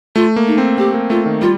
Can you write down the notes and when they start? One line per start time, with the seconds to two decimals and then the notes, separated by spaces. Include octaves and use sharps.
0.16 A3 F4
0.36 A#3
0.47 D#4
0.58 C4
0.78 C4 G4
0.94 A#3
1.10 A3 F4
1.26 D#3
1.42 G3 F4